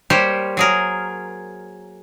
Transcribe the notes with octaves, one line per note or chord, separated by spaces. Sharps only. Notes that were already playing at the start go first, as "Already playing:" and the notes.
G3 A#3 G4 C5 C#5
F#3 G#4 A#4